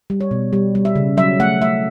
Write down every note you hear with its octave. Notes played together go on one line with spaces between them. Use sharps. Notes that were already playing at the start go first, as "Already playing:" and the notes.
G3
C#5
B2
G3
G3
E5
C#3
F#3 E5
A3 F#5
A3 E5